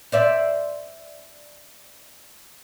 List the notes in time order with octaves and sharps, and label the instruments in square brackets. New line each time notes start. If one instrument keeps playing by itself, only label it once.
[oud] C5 D5 E5